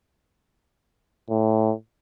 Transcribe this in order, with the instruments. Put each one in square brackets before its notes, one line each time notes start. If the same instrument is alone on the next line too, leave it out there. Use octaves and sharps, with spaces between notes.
[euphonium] A2